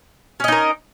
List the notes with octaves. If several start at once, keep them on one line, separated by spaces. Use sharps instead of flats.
C#4 D#4 A#4 D#5